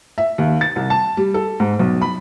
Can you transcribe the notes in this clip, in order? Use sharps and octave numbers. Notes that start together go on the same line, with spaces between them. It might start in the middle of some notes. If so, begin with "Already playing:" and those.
E5
D#2
A6
C2
A5
G3
A4
G#2
B1
B5